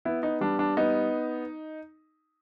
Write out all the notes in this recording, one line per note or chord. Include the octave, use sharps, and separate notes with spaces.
B3 E4
D#4
G3 D4
D4
B3 D#4